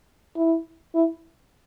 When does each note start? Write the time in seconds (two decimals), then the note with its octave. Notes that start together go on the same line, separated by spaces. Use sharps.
0.36 E4
0.94 E4